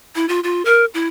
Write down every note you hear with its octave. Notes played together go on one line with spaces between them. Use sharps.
E4
F4
F4
A#4
E4